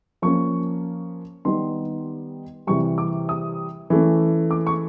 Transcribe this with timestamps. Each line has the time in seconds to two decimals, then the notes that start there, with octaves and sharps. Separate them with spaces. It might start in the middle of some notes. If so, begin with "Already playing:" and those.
0.22 F3 A#3 C#4 C#6
1.45 D#3 G3 B3 D#4 C6
2.67 C3 E3 G3 C#6
2.98 D6
3.29 D#6
3.90 E3 A3 C#4
4.51 D6
4.67 C#6